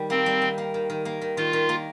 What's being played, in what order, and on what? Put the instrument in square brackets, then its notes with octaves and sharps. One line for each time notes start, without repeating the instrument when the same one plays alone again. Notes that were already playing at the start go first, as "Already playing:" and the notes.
Already playing: [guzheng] D#3 G3
[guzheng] A#3 [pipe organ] C4
[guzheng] G3
D#3
A#3
D#3
D#3
A#3
D#3
[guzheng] D#3 [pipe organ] F4
[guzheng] D#3
A#3